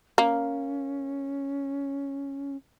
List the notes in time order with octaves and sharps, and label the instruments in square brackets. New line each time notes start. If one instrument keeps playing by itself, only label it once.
[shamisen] A#3 [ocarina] C#4